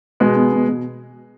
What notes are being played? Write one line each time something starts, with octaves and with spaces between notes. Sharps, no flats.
B2 G#3 B3
B2
B2
B2